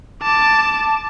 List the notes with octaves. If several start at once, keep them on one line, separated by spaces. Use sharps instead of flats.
A5 D6